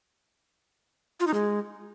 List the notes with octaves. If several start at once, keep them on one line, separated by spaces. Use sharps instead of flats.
F4
D#4
G#3